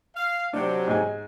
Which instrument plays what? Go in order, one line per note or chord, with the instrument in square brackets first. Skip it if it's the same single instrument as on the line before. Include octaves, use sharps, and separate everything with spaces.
[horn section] F5
[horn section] C3 F#3 [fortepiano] D4
[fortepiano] G#2 G#5